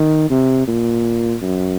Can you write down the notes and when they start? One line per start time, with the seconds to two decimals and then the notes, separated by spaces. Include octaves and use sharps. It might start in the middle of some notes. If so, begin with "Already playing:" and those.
Already playing: D#3
0.30 C3
0.68 A#2
1.42 F#2